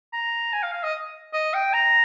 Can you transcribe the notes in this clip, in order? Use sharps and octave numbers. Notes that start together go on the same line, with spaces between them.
A#5
G#5
F5
F5
D#5
D#5
G5
A#5